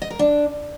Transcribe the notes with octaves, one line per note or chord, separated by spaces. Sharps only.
D#5
A#4
D4